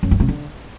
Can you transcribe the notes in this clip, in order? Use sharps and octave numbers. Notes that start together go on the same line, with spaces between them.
F#2
G2
C3
D3